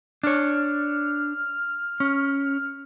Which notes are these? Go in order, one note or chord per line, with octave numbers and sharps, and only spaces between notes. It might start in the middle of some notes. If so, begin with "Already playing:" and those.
D4 C#5 F6
C#4